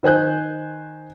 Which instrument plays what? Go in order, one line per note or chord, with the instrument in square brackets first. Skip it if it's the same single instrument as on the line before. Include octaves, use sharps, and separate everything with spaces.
[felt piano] D#3 C5 G#5 F#6 G6